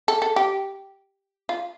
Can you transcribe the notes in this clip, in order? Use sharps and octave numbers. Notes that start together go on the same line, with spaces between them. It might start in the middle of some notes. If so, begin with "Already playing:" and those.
A4
A4
G4
F4